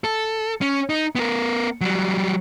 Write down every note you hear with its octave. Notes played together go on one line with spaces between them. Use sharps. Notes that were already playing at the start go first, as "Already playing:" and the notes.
A4
C#4
D#4
B3 A#4
F#3 G3